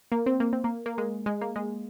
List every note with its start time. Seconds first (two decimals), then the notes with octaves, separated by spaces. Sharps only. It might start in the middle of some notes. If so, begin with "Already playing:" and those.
0.12 A#3
0.26 C4
0.40 A#3
0.53 C4
0.64 A#3
0.86 A#3
0.98 G#3
1.26 G#3
1.41 A#3
1.56 G#3